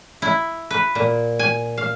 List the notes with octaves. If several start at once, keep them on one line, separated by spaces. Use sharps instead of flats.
E4
B4
A#2
G#5
F5